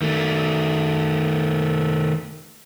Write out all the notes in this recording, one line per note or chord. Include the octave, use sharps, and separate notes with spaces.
D#3 A3